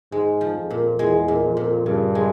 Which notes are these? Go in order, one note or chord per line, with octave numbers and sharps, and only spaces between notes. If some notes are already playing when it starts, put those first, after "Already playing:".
G#2 G#3
F3
F2
A#2
E2 G#3
A#2
F2
A#2
G2 C#3
G#3